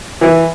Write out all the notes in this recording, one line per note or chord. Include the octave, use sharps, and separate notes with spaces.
E3